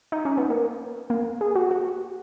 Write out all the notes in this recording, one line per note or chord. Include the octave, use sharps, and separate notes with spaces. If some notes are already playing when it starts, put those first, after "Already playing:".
D#4
C#4
B3
A#3
A#3
G#4
F#4
F#4